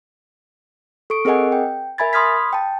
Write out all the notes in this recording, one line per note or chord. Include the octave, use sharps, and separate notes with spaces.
A4 C#6 D7
C4 G#4 A#4 D#5 F#5 G#5
G5
A#4 E5 G#5 B5 G#6 A6
B5 C6 D#6 F6 G#6 B6
G5 A5